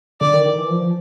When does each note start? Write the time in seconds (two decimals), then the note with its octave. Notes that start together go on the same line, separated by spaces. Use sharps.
0.21 D3 D5
0.33 D#3
0.46 D#3
0.58 E3
0.70 F3